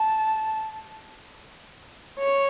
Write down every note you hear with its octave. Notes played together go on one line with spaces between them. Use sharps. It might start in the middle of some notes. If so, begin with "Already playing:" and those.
Already playing: A5
C#5